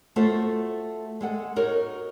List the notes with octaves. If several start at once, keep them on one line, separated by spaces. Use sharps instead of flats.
A3 F4 F#4 A4 C5
G#3 A4 F#5
D#4 F#4 A#4 C#5